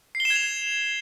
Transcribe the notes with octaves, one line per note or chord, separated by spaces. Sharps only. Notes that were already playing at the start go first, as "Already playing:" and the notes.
C7
G7
E7
G#6
F7